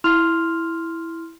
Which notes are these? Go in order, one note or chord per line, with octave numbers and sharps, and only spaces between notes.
E4 C6 F6 F7